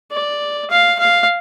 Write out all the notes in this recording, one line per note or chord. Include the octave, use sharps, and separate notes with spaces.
D5
F5
F5